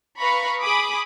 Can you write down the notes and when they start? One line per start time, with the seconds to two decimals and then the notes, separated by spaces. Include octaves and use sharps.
0.18 B4 F5 A#5 B5 C#6
0.61 G#4 B5 D6 D#6